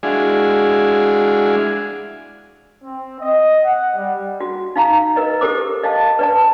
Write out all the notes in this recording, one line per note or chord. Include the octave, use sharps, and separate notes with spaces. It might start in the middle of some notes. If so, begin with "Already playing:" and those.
G#3 D4 E4 F#4 F5 G#5
C4
D#5
F#5
G3
F#4
D#4 F5 A#5
A#4 B4 D#5
G4 A4 A#4 C5 D6
D#5 F5 A5
B4 D5 A5